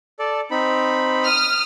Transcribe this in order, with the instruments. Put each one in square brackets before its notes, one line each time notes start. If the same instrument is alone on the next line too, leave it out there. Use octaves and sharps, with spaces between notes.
[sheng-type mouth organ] A4 D5
C4 D#4 B5
[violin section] D#6 F6